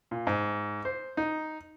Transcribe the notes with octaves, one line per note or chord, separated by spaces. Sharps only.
A#2
G#2
C5
D#4